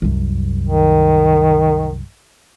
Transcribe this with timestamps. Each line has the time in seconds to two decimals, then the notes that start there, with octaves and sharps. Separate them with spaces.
0.02 C2 F#2
0.64 D#3